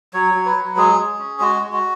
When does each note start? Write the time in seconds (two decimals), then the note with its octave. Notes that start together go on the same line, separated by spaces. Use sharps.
0.14 F#3 C#5
0.35 F#3
0.46 B4
0.56 F#3
0.77 G#3 G#4
0.99 G#3
1.19 C#4
1.40 G#3 F#4
1.62 G#3
1.73 F#4